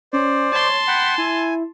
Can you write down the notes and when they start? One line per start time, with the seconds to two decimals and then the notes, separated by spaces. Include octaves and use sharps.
0.13 C#4 C5 D5
0.52 C#5 A5 C6
0.87 F#5 G5 B5
1.18 E4 G#5